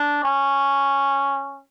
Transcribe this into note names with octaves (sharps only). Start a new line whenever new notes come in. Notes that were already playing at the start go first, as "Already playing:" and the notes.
Already playing: D4
C#4